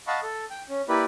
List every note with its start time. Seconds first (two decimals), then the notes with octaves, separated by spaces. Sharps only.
0.07 D#5 F5 F#5 A5 B5 C#6
0.23 A4
0.50 G5
0.69 C#4
0.89 A#3 E4 G4 B4 D5 B5